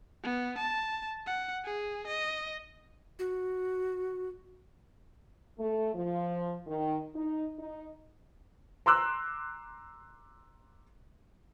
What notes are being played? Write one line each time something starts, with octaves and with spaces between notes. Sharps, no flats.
B3
A5
F#5
G#4
D#5
F#4
A3
F3
D#3
D#4
D#4
A#5 C6 D6 E6 F#6